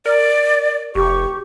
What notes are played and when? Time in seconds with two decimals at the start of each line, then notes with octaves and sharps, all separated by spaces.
0.06 A#4 D5
0.95 F1 G4 C#6